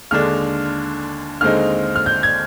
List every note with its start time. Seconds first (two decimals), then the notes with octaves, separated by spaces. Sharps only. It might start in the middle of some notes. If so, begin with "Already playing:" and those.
0.11 D#2 D3 G#3 D4 F6
1.41 D#2 D3 G#3 C4 D#4 F6
1.96 F6
2.06 G6
2.23 G#6